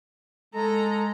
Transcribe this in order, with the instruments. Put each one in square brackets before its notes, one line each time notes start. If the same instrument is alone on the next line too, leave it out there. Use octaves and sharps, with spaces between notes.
[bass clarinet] G#3 [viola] A4 A#5